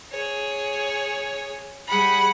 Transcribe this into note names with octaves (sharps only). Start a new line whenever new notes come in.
G#4 C#5
G3 G#4 F#5 B5